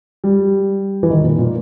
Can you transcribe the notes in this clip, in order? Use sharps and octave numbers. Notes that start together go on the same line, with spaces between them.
G3
E3
D#3
A#2
A#2